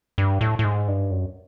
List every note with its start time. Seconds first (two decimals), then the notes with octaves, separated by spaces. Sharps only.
0.18 G2
0.41 A2
0.59 A2
0.64 G#2
0.88 G2
1.11 F#2